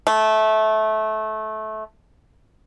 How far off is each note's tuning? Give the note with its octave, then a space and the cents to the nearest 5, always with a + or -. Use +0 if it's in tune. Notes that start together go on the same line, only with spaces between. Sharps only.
A3 -20